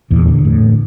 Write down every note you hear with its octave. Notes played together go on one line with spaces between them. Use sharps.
E2 A#2 E3
D3
A2